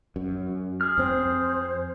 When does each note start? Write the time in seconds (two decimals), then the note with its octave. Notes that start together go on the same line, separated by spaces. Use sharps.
0.16 F#2
0.81 G#4 F6
0.98 F2 C4 C5